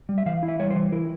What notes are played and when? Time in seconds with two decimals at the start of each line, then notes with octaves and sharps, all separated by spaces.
0.09 G3
0.18 E5
0.26 E3 F5
0.43 E4
0.48 E5
0.59 G3 C#5
0.70 C5
0.75 E3
0.92 E4 A#4